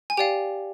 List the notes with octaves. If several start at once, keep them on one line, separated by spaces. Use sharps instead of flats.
G#5
G4 D5 F5 G5